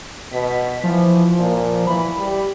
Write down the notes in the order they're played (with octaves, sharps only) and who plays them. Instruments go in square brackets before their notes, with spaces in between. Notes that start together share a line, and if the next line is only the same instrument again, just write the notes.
[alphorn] B2 [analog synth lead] B6
[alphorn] E3 [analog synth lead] F3
[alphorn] A#2
[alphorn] E3 [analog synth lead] B5
[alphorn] G3